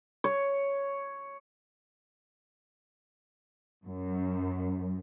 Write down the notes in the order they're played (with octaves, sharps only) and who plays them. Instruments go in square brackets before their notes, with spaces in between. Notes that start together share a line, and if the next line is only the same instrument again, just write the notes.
[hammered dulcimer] C#5
[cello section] F#2